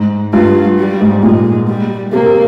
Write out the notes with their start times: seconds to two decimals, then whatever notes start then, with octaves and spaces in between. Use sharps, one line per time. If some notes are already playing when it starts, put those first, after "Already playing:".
Already playing: G#2
0.33 G2 F4
0.78 G3
1.01 G#2
1.23 A#2 G#3
1.68 G3
2.12 C3 A#3